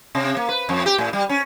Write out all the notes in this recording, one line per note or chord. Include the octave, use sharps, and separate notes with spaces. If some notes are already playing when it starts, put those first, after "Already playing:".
C3
A#3
B4
F2
G4
A2
G3
C#4